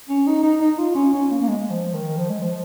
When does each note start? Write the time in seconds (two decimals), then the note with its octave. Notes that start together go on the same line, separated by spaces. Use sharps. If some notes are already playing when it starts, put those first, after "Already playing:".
0.09 C#4
0.27 D#4
0.44 D#4
0.61 D#4
0.78 F4
0.95 C#4
1.14 C#4
1.31 A#3
1.42 A#3
1.48 G#3
1.70 F3
1.94 D#3
2.17 F3
2.30 G#3
2.42 F3